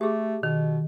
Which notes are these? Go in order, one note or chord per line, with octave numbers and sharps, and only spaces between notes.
A3 G4 G#4
B2 D#3